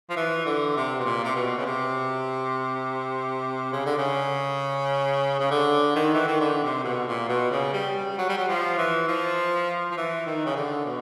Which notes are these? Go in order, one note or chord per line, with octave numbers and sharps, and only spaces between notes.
F3
E3
D3
C3
B2
A#2
C3
B2
C#3
C3
C#3
D3
C#3
C#3
D3
D#3
E3
D#3
D3
C3
B2
A#2
B2
C#3
G3
G3
F#3
G3
F#3
F3
E3
F3
F3
E3
D#3
C#3
D3
B2